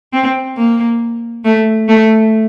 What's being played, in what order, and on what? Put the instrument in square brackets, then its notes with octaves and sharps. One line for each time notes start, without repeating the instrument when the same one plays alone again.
[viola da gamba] C4
A#3
A3
A3